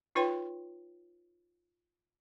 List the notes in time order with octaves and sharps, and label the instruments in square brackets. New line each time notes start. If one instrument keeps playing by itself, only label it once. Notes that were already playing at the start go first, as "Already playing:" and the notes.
[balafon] D#4 F4 B4 C#5 G5 C6